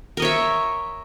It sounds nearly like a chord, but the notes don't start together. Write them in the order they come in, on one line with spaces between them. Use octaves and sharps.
A#4 D#5 C#5 E5